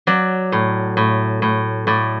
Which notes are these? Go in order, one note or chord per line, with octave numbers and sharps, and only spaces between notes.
F#3 D5
A2
A2
A2
A2 D5